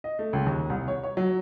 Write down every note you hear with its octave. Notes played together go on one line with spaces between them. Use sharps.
D#5
A3
C#2
D#2
C2
C#5
C#5
F#3